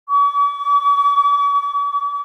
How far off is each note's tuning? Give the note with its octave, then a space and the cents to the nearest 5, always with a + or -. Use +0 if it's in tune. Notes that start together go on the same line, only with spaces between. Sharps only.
D6 -45